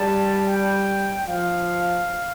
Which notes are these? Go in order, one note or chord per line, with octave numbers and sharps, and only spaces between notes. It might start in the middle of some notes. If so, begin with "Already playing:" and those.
Already playing: G3 A5
G5
F3 F5